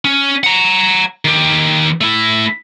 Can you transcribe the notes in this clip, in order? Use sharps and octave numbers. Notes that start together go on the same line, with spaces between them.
C#4
F#5 A#5
D#3 G4
A3 E4